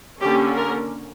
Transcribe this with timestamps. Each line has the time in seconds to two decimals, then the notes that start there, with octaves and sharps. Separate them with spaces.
0.20 D3 A#3 C#4 G4
0.56 A#4